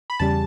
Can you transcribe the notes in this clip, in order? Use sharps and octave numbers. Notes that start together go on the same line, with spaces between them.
B5
E2 C#3 G3 C#4 A5